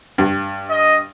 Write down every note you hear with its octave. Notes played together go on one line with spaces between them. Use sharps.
G2
D#5